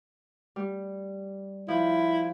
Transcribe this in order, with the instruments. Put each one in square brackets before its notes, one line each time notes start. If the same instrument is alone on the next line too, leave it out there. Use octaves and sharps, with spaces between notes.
[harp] G3
[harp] F3 [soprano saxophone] E4